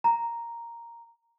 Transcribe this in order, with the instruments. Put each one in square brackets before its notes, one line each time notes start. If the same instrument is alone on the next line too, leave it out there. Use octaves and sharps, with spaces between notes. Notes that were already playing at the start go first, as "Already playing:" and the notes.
[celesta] A#5